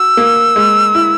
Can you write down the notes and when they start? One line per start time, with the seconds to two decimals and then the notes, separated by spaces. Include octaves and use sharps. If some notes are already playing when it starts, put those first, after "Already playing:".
Already playing: F#4 E6
0.17 A#3
0.56 G#3
0.95 E4